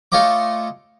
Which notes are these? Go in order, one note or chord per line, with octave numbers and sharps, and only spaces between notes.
A3 F4 C#5 D#5 D6